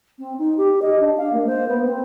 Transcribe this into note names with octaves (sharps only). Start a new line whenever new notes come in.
C4
D#4
G4
D#5
D4
F5
A#3
C5
B3
C4